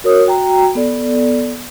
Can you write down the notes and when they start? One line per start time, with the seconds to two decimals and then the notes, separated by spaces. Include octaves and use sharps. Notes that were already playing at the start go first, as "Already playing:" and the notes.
0.04 F#4 A#4 C#5 D#6
0.27 F#4 G5 A#5
0.75 B3 A4 D5